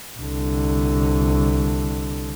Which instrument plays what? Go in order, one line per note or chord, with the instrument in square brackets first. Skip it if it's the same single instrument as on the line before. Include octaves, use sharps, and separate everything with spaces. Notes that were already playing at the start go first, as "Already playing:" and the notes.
[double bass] C2 D3